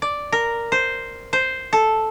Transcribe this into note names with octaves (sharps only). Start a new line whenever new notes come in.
D5
A#4
C5
C5
A4